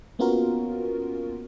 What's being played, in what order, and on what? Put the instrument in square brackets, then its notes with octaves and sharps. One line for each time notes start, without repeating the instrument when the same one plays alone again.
[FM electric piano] A#3 B3 C#4 F4 F#4 A#4